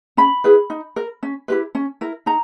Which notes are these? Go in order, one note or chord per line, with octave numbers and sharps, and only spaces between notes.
C#4 B5
E4 G#4 B4
D#4
A#4
C#4
E4 G4 B4
C#4
E4 A#4
D#4 A#5